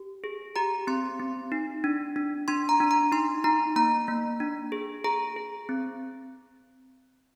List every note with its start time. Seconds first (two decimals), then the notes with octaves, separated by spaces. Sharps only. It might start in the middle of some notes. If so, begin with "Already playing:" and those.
Already playing: G4
0.24 G#4
0.56 G4 A#5
0.87 C4 C6
1.19 C4
1.52 D#4
1.84 D4
2.16 D4
2.48 D4 C6
2.69 A#5
2.80 D4
2.91 A#5
3.12 D#4 C6
3.44 D#4 A#5
3.76 A#3 A#5
4.08 A#3
4.40 D4
4.72 G#4
5.04 G#4 A#5
5.36 G#4
5.69 C4